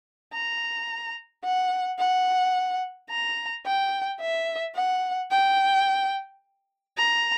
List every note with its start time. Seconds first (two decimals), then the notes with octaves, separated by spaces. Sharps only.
0.34 A#5
1.44 F#5
1.99 F#5
3.10 A#5
3.66 G5
4.21 E5
4.76 F#5
5.32 G5
6.98 A#5